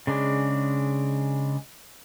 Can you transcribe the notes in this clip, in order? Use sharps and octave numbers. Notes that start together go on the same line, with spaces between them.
C#3 G#3 D4